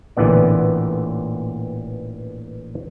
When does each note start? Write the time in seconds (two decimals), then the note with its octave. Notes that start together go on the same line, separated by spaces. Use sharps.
0.17 A1 A#2 D3 E3 B3 D5